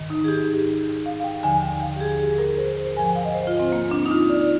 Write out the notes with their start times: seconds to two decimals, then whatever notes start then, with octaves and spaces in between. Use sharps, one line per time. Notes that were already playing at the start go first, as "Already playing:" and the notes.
Already playing: G#2 D#3
0.10 D#4
0.24 G#4
0.28 G4
1.06 F5
1.20 F5
1.24 G5
1.43 D#2 D3 F3 G#5
1.63 G5
1.82 F5
1.96 G4
2.00 G#4
2.20 G#4
2.38 A#4
2.58 C5
2.77 C5
2.97 G#2 G#5
2.99 F3
3.06 G5
3.15 F5
3.25 D#5
3.34 C5
3.47 F4
3.60 C4
3.72 A#3
3.91 D4
4.06 D#4
4.11 F4
4.30 D5